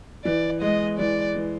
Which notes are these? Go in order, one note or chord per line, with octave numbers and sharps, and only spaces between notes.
E3 D5
G#3 D#5
E3 D5
E3